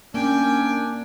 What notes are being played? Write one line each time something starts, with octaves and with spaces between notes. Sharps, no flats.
A#3 C#4 D4 G5 G#5